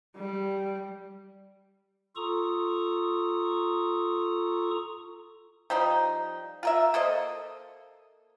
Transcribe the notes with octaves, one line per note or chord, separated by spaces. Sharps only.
G3
F4 A4 A#5 C#6 D#6
F3 G3 D#4
F4 A#4 E5
A#3 A4 C5 D#5